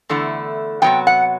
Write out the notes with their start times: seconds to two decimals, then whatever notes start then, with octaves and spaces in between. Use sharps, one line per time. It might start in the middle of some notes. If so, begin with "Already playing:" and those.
0.09 E2 D3 A3 E4
0.82 C3 F#3 B3 G5
1.07 F#5